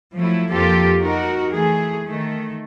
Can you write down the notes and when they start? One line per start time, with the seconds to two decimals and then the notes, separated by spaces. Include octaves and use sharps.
0.15 F3 F#3 A3 E4
0.51 F2 F3 A#3 F4 G4 A4
1.02 D#4 F#4 A#4
1.52 E3 A3 G#4
2.06 D#3 A3